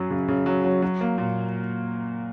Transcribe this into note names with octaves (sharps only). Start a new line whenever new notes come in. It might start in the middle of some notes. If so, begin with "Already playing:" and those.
Already playing: F#2 F#3
C#3
C#3
F#3
F#3
F#3
A#3
A#2